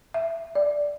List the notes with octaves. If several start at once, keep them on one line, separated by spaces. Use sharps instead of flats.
E5
D5